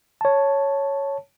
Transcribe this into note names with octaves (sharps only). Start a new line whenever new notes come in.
C#5 A5